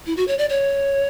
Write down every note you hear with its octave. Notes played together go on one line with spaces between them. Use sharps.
E4
F#4
C#5
D5
C#5